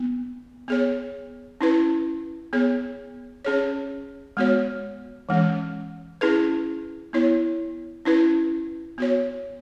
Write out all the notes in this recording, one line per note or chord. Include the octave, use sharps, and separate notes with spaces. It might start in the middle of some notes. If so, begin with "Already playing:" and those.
Already playing: B3
B3 G#4 C#5
C#4 E4 B4
B3 G#4 C#5
C#4 G#4 C#5
G#3 B3 F#4 C#5
E3 G#3 C#4
C#4 E4 G#4 B4
B3 E4 C#5
C#4 E4 B4
B3 F#4 C#5